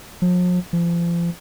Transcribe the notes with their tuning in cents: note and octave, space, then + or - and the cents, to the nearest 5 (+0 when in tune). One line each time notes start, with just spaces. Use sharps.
F3 +45
F3 -35